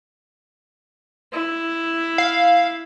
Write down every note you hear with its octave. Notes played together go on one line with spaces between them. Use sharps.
E4
F5